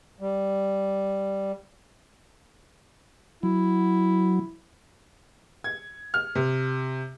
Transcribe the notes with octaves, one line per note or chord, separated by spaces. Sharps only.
G3
F#3 E4
G#6
F6
C3